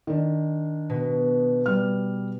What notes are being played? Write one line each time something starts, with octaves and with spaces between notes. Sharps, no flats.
D#3 D4
B2
G3 F6